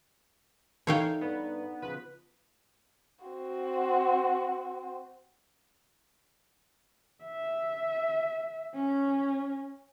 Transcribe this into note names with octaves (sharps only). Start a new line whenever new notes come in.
E3 D#4 A4 C#5 F5 G5
G2 B3
C#3 F3 B4
C4 F#4
E5
C#4